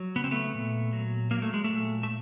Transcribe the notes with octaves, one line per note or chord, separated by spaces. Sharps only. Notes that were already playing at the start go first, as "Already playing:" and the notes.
Already playing: F#3
C#3 B3
C4
A3 B3
A#2
F#3
F#3 A#3
A3
G#3
A#2 A3
A3